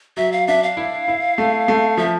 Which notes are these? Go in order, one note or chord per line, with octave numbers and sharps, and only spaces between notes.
F#3 E5
F5
D4 E5
F5
E4
E4
A3
A3
F3 E5